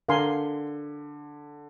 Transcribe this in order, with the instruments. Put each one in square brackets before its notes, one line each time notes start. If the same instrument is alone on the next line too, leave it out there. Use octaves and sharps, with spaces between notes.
[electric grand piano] D3 [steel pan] A#4 F5 G#5 C6